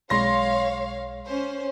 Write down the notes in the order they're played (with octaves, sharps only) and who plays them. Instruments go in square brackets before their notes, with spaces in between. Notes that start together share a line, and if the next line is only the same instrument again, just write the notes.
[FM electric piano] B1 G#3 [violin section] C#5 F5 [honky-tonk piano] C6 A#6
[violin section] C#4 C5